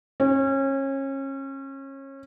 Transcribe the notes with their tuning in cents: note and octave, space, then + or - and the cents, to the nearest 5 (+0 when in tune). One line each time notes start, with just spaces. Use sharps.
C#4 -30